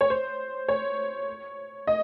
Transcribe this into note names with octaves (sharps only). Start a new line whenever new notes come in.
C#5
C5
C#5
D#5